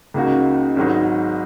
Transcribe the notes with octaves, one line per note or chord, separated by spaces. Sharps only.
C#2 C#3 A#3 D#4 F#4
G#1 G#2 F#3 D#4